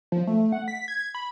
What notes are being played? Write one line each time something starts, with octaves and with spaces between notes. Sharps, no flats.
F3
A3
F#5
B6
G#6
B5